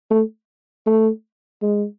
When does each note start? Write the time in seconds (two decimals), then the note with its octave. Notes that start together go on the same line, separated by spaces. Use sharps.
0.11 A3
0.86 A3
1.62 G#3